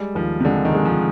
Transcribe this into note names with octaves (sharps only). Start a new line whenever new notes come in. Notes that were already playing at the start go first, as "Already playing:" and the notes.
Already playing: G3 G#3
D#2 F3
C3
D3 G#3
D#3
G#3
F3